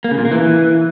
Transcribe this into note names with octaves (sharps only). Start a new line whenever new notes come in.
A#3
C#3
A#2
A#3
E3